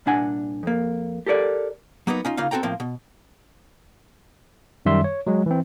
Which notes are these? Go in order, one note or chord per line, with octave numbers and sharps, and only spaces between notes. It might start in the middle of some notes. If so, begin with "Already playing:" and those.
C2 A#2 D4 F#5 G#5
F2 A#3
G4 A4 A#4 C#5 D5
F#3 A#3 B3 D#4
C#4 D#4 F4
C#3 A#3 D#4 F4 F5
C4 F#4 A4 G5 A#5
A2 F3 A#3 C4
B2
F#2 D#3 G3 E5 C6
C#5
F#3 G#3
E3 C4